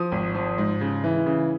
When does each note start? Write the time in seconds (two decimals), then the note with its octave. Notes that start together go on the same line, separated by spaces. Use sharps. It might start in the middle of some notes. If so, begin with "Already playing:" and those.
Already playing: F3 D#6
0.12 G#1
0.35 F3
0.58 G#2
0.81 C#3
1.04 E3
1.26 C#3